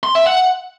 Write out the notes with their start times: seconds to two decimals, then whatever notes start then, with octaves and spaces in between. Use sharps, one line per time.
0.03 C6
0.15 E5
0.27 F#5